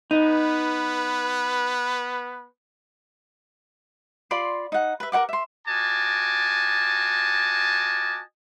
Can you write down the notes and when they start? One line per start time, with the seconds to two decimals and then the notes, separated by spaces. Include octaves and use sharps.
0.11 B3 D#4 B4
4.31 F4 D5 B5 C6
4.72 D#4 F#5
5.00 B4 E5
5.12 A#4 C#5 F#5 D6
5.29 E5 C6
5.68 F4 F#4 D#5 G#5 A5 D6